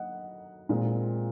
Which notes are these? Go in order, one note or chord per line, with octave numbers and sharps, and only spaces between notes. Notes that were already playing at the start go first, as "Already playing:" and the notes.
Already playing: F#3 A#3 D#5 F#5
A#2 G#3 C4